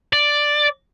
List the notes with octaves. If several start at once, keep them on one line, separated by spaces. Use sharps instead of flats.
D5